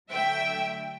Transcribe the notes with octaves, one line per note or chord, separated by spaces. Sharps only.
D3 F#3 A3 E5 G5